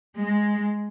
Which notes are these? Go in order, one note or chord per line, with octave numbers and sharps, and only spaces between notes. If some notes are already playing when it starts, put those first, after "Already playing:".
G#3